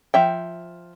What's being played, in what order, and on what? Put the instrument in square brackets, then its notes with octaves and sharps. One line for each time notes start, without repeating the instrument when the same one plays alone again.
[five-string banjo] F3 E5 G5